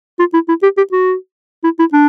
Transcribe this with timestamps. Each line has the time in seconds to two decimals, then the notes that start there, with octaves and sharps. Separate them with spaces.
0.19 F4
0.34 E4
0.49 E4
0.63 G4
0.77 G4
0.92 F#4
1.64 E4
1.79 E4
1.93 D4